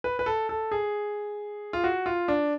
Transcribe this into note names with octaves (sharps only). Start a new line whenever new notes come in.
B4
B4
A4
A4
G#4
F4
F#4
F4
D4